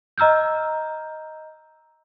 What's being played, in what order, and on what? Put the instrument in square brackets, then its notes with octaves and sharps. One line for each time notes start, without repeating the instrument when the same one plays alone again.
[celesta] D#5 A#5 E6 F6 G6